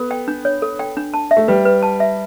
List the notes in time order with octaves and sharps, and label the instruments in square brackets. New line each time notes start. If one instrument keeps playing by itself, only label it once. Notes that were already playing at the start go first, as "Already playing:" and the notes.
Already playing: [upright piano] B3 [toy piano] A4
[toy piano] G5
D4
C#5
A4
G5
D4
A5
E5
[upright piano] A3
[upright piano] G3 [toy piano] B4
[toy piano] B4
A5
E5